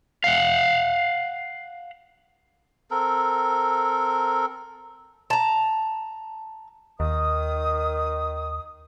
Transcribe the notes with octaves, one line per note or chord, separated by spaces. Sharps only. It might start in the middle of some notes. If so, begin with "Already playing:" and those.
F5 F#5
C4 A4 A#4
A5 A#5
D#2 D#3 D#6